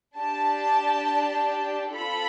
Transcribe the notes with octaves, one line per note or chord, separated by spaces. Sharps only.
D4 G4 A5
C4 F4 A4 B5